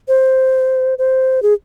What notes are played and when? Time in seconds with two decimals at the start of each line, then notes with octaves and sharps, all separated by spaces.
0.08 C5
0.98 C5
1.43 G#4